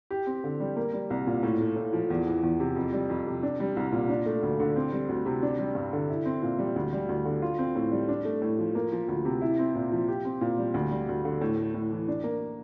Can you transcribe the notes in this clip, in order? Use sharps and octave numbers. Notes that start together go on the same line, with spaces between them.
G4
C4
D3
G3
A#3
G3
C2
A#2
A2
A3
A2
F3
E2
E3
E2
C3
F2
G3
F2
C3
D4
G3
C2
A#2
D4
A3
D2
D3
C4
G3
D2
C3
D4
G3
G2
D3
E4
C4
A#2
G3
D2
G3
D2
D3
F4
C4
A2
G3
D4
A3
A2
F3
A#3
F3
D2
C3
E4
C4
A#2
F3
G4
C4
A#2
G3
D2
G3
D2
D3
A2
A3
A2
E3
D4
A#3